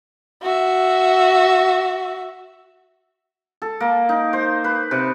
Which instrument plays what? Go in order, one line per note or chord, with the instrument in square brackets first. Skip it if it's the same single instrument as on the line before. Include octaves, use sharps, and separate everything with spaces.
[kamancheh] F#4 E5
[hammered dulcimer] A4
A#3
D#4
C5
B4
C3